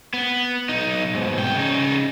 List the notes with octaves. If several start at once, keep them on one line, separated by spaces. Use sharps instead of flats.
B3
B1 D#4
G#2 B2
C2 G5
C#3 D#4